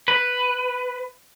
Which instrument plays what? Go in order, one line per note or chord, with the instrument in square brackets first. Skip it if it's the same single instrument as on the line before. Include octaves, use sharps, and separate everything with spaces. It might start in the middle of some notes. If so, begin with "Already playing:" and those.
[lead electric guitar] B4